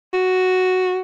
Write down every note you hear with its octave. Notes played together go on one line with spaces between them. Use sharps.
F#4